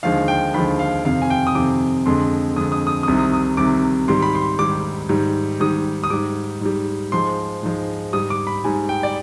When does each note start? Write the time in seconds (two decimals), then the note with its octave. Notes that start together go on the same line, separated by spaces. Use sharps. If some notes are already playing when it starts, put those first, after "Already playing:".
0.03 D#2 D3 F3 G#3 F5
0.28 G5
0.54 D#2 D3 F3 G#3 B5
0.79 F5
1.04 F2 C3 D#3 F5
1.22 G#5
1.30 G5
1.47 D#6
1.55 F2 C3 D#3 D6
2.06 F2 D3 G#3 C6
2.56 F2 D3 G#3 D#6
2.72 D#6
2.87 D#6
3.03 D#6
3.08 C2 C3 D#3
3.18 D#6
3.33 D#6
3.57 C2 C3 D#3 D6
4.08 G#2 D#3 G3 C6
4.22 B5
4.35 C6
4.59 G#2 D#3 G3 D6
5.09 G#2 D#3 G3
5.60 G#2 D#3 G3 D#6
6.04 D#6
6.10 G#2 G3 D6
6.61 G#2 G3
7.12 G#2 F3 G#3 C6
7.63 G#2 F3 G#3
8.13 G#2 G3 D#6
8.30 D6
8.47 B5
8.64 G#2 G3 G#5
8.89 G5
9.03 D5